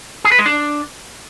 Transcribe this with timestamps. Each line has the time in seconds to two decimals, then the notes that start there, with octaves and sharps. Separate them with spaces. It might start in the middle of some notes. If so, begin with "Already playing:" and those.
0.25 G#4
0.32 B4
0.39 G#3
0.46 D4